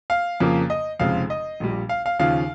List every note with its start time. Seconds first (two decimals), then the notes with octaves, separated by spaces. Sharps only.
0.10 F5
0.40 F2 C#3 F3 A#3
0.70 D#5
0.99 F1 F2 C#3 G#3 C4 F5
1.30 D#5
1.60 A#1 A#2 G3
1.89 F5
2.06 F5
2.19 D#2 C#3 F3 F5